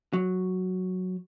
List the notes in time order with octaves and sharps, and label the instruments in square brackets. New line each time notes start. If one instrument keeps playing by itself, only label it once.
[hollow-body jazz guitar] F#3